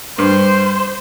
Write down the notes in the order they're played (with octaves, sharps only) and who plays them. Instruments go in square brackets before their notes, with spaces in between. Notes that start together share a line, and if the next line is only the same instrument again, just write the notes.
[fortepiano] G2 [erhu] C5